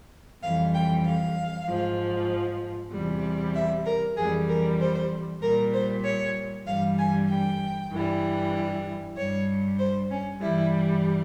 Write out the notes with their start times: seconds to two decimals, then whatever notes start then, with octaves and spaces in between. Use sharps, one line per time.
0.42 F2 E3 G3 F5
0.74 G5
1.05 F5
1.68 G#2 F3
2.92 E2 C3 E3 G3
3.55 E5
3.85 A#4
4.17 F2 E3 G3 G#4
4.48 A#4
4.79 C5
5.41 A#2 G3 A#4
5.73 C5
6.04 C#5
6.66 G2 E3 G3 F5
6.98 G#5
7.29 G5
7.91 G2 E3 G3
9.16 G2 G3 C#5
9.78 C5
10.10 C#4
10.41 G2 E3 G3 E4